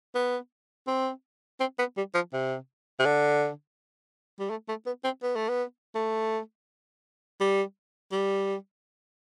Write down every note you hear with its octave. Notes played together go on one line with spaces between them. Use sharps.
B3
C4
C4
B3
G3
F3
C3
C3
D3
G3
A3
A3
B3
C4
B3
A3
B3
A3
G3
G3